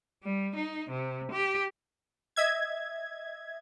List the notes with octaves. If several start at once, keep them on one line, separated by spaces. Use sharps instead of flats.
G3
D#4
C3
G4
D#5 E5 G#6